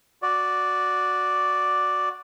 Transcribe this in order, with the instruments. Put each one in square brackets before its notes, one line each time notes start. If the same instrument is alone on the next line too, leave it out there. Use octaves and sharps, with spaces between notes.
[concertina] F#4 D5